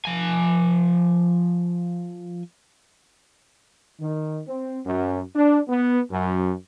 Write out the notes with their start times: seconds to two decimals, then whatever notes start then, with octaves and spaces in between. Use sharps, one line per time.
0.05 F3 G#5
4.00 D#3
4.47 C4
4.86 F#2
5.34 D4
5.68 B3
6.11 F#2